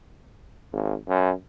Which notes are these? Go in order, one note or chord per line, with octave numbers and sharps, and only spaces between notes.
G#1
F#2